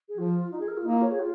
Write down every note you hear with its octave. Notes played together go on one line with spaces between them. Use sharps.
G#4
F3 F4
D#4
G#4
A#4
F4
A#3 D#4
F4
C#5
G#4
F4